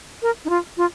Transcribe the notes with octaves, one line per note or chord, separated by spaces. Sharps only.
A#4
D#4
F4
F4